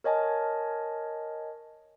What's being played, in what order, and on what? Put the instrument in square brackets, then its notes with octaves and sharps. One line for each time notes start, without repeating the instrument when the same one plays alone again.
[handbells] A#4 C#5 D#5 G#5 A5